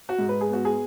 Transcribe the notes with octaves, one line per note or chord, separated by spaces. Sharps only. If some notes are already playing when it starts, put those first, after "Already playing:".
F#4
G#2
B4
G#4
B3 F#4
G#4